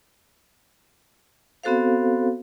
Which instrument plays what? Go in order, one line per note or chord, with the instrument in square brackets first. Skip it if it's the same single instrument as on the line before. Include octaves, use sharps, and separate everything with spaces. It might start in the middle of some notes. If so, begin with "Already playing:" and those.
[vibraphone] B3 C4 F#4 A4 C5 F5